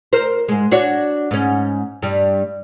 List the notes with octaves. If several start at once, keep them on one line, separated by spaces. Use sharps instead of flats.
A#4 C5
G#2 G#3
D4 F#4 C#5
G#2 C#4
G2 G3